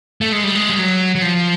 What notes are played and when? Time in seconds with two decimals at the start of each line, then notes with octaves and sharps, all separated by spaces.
0.21 A3
0.32 G#3
0.43 G3
0.55 G#3
0.69 G3
0.78 F#3
1.15 F#3
1.22 F3